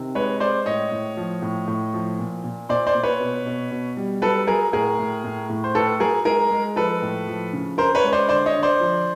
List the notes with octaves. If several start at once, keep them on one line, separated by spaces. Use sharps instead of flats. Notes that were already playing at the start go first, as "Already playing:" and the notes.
Already playing: C3 D#3
G#3 B4 C#5
G#3 C5 D5
A2 C#5 D#5
A2
F3
A2
A2
F3
A#2
A#2
A#2 C5 D5
C5 D5
A#2
B4 C#5
B2
B2
B2
G3
F#3 A4 B4
F#3 G#4 A#4
A2 G#4 A#4
A2
A2
A2
C5
A2 A4 B4
F#3 G#4 A#4
G#3 G#4 A#4
G#3
F3 A4 B4
A2
F3
C#3
C#3 A#4 C5
B4 C#5
G#3
C5 D5
D3 C5 D5
C#5 D#5
D3
C5 D5
F3